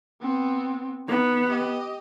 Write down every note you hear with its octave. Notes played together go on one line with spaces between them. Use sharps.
B3 C4
B3 D#4
G4 D#5